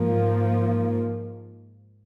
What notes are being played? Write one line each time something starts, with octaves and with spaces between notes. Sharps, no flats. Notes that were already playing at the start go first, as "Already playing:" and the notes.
Already playing: G#2 F3 A#3